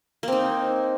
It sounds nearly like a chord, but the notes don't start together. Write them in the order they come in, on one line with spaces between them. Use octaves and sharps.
A#3 C4 D#4